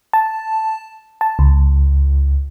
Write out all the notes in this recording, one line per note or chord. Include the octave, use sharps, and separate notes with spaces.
A5
A5
C#2